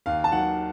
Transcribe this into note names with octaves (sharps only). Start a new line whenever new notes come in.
D#2 F5
A5
D#3 F#3 F#5